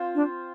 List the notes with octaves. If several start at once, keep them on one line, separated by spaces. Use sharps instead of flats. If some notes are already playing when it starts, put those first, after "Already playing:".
Already playing: C4 F4 C5
D4